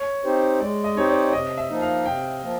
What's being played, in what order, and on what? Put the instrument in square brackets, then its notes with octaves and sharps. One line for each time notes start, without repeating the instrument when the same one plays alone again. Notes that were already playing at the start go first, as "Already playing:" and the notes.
Already playing: [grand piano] C#5
[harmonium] C4 D#4 G4 C5
[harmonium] G#3 [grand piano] D5
[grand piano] D#5
[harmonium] C4 D#4 G4 C5 [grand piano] C#5
[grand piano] D5
D5
[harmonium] C3 [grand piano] D#5
[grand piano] E5
[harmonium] F3 A#3 D#4
[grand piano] F5
[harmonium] C3 [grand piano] G5
[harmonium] F3 A#3